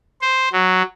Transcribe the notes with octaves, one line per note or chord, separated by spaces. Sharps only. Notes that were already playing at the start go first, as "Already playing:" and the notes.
C5
F#3